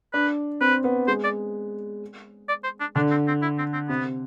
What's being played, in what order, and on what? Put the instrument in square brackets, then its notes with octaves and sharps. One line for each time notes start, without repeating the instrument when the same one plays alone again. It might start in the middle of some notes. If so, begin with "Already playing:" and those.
[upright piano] D4 [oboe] B4
[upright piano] C4 [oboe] B4
[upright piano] B3
[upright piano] G#3 [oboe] C5
[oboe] D5
D5
C5
D4
[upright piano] D3 [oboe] D4
[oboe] C4
C4
E4
C4
C4
[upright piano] C3 [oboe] B3